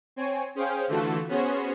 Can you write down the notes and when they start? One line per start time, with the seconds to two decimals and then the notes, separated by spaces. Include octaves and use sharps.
0.16 C4 C#5 G#5
0.55 C#4 G#4 C5 F5 G5
0.88 D3 E3 A3 F4 F#4 A4
1.28 B3 C#4 F#4 G#4 C5 C#5